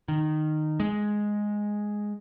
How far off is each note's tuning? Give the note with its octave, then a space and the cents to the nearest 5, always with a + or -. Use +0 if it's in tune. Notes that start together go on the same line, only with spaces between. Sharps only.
D#3 -15
G#3 +0